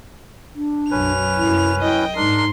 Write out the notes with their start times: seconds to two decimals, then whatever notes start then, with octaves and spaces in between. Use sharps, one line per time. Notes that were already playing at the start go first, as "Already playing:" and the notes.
0.55 D4
0.91 B1 F#2 F#3 C#4 B4 F7
1.36 C2 F#2 E4
1.81 E4 D#5 G5
2.16 G#2 G#3 D4 D#4 A#4 C6